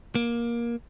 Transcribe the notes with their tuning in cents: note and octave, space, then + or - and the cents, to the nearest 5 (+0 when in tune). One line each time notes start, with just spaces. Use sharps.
A#3 +15